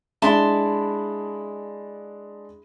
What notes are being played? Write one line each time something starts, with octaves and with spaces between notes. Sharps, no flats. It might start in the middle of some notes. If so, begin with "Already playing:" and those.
G#3 D4 E4 A5 C6